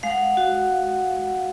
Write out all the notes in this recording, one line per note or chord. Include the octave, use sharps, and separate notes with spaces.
G#3 F5
F#5
F5
F#4